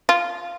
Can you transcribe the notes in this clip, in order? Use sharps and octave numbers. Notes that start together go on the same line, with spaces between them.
F4